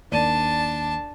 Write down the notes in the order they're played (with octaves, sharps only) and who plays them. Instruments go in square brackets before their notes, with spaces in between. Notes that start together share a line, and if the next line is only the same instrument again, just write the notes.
[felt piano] D#2 D5 D#7 [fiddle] D4 A5